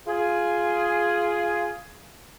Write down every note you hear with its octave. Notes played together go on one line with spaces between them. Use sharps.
F4 G#4